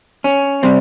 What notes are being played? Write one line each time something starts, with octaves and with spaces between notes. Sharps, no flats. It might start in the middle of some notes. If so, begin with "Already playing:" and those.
C#4
C3 G3 C4